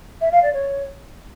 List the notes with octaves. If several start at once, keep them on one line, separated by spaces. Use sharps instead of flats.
E5
F5
D5
C#5